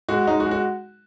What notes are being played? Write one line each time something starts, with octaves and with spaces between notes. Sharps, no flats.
G#3 F#4
G#3 D#4
F#4
G#3
F#4